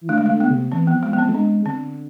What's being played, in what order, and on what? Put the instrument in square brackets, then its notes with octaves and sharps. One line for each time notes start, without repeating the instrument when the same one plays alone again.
[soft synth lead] E3
[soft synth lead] D3 [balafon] A3
[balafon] G#3
[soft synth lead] D3 [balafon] A3
[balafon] B3
[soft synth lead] C3
[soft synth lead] E3 [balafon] C4
[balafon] B3
[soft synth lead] F3
[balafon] G#3
[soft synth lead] F3 [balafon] B3
[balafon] C4
[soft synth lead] A3
[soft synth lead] G#3 [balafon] D4
[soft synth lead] D3 [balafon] C4